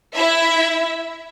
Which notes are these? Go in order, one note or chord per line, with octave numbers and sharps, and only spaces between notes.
E4 E5